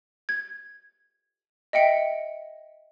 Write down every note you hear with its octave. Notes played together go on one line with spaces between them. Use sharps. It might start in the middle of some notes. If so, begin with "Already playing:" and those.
G#6
D#5 E5 G5 C#7